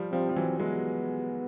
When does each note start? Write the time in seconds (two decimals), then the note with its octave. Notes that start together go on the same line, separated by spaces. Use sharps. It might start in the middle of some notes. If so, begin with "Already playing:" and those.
Already playing: F3 G3
0.13 F3 G3 C4
0.29 F3
0.36 E3 F#3
0.60 F#3 G#3 B3